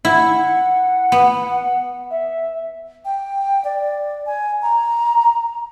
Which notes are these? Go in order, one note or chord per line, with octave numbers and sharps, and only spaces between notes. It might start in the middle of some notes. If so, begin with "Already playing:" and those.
E4 F#5
B3
E5
G5
D5
G#5
A#5